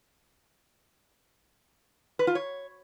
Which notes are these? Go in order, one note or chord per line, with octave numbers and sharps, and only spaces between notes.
B4
F4
C#5